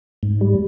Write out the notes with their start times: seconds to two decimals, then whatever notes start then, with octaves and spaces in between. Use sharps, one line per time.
0.23 G#2
0.41 G3